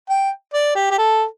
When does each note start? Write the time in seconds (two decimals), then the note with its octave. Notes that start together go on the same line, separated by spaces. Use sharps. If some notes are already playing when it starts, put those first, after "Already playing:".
0.10 G5
0.53 D5
0.75 G4
0.91 G4
0.98 A4